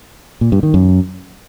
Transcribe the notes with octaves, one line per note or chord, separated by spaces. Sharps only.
A#2
G2
D#3
F#2